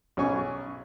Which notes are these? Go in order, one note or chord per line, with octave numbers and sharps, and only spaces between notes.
B1 C#4 G#5 C#6